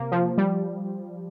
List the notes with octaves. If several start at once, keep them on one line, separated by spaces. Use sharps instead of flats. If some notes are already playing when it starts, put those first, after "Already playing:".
Already playing: C3 A#3
F3
G3